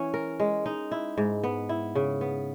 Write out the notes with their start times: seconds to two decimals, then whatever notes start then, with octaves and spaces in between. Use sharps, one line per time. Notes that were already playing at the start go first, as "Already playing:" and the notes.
Already playing: E3 C#4
0.14 A#4
0.40 G#3
0.66 D#4
0.91 E4
1.18 G#2
1.44 B3
1.69 E4
1.95 C#3
2.21 B3